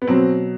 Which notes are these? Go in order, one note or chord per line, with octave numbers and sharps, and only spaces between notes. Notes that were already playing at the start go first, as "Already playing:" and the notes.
B3
B2 F#3 C4